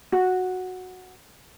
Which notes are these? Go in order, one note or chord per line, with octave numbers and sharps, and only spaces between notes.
F#4